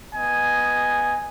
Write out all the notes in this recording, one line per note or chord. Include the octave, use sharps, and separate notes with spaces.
B3 D#5 G#5